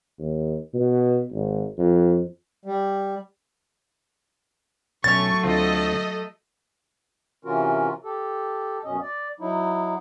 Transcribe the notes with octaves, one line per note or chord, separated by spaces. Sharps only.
D#2
B2
G#1
F2
G3
B1 F#3 A3 C#4 C#5 C#6 A6
D2 C4 F4 A4 D#5
C3 E3 C#4 F4 F#4 A#4
G4 A4
F#2 B2 C#4 D#5
D5
F#3 D#4 E4